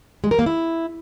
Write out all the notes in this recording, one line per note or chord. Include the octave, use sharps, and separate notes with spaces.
G#3
A#4
A#3
E4